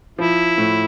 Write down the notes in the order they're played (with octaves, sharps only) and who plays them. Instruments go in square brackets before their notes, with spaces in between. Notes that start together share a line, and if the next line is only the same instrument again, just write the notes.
[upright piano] F3 [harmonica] E4
[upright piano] A2